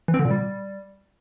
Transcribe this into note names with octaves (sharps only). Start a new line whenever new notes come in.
E3
C4
D3
A#2
G3